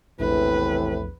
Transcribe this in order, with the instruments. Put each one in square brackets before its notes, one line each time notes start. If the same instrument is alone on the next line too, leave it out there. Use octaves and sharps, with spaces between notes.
[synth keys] A#1 E2 [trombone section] A2 C3 E3 [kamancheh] B4